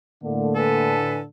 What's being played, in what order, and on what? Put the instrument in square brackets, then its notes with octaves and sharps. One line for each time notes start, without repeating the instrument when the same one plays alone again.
[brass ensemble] A2 D3 [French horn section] A3 A#3
[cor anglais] A4 [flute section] B4 G#5